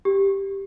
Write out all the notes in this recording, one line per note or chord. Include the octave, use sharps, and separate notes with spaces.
G4